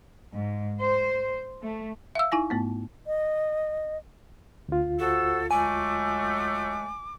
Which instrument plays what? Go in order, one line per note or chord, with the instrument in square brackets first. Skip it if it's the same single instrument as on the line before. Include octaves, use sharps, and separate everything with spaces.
[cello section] G#2
C5
A3
[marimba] E5 F5 E6
D#4 E4 G#5 A#6
G#2 A3 B3
[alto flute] D#5
[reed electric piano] D2 F4
[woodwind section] F#4 C5 E6 [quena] A4
[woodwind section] F#3 G#3 A3 [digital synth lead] G#5 [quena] D6